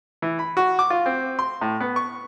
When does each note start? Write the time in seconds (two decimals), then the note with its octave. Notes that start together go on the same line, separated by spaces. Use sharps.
0.22 E3
0.39 B5
0.57 F#4
0.79 D6
0.90 F4
1.06 C4
1.39 C6
1.61 A2
1.80 B3
1.96 C#6